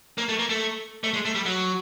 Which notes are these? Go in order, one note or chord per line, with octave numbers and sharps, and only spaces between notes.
A#3
A3
A#3
A3
A3
G#3
A3
G3
F#3